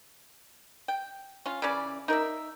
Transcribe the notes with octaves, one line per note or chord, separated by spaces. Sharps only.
G5
C#4 F4
C#3 E3 C#4 D5
D#4 A#4 D5 E5